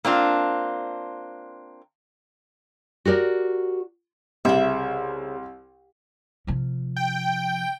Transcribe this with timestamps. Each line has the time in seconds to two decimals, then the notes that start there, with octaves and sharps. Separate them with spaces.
0.05 A#3 C4 D4 F4
3.05 F#4 G4 A#4 D5
4.45 C2 C#3 E5
6.47 C3 F3
6.96 G5